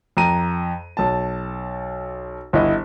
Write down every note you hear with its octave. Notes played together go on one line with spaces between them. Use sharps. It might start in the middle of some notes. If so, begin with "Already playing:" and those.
F2 A#5 D#7
B1 A5
G1 E4 D#5